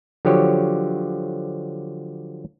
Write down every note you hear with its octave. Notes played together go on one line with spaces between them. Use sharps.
D3 F3 F#3 G4 C#5